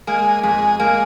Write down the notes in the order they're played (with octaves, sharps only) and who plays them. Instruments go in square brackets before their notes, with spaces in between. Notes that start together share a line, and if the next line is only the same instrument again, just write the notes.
[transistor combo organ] G#3 [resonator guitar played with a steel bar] A#3
[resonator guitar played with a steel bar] F2 [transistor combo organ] G#3
[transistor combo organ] G#3 [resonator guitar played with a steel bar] A#3